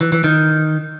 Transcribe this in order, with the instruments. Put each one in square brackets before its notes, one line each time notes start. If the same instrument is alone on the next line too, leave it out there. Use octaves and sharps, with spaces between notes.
[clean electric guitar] E3
E3
D#3